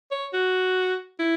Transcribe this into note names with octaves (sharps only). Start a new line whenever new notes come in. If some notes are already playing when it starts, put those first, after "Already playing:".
C#5
F#4
E4